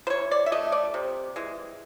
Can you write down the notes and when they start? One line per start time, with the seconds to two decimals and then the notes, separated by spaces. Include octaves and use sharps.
0.07 C5
0.10 E3 C#5
0.31 D5
0.46 E5
0.52 A3 D#5
0.72 D5
0.94 C3
1.36 E3 G#3